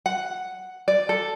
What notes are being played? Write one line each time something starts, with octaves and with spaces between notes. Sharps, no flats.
F#5
D5
A4